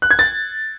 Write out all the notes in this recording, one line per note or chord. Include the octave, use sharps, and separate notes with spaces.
F#6
G#6
A6